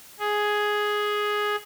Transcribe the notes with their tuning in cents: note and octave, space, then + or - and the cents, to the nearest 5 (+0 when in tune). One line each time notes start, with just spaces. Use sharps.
G#4 +5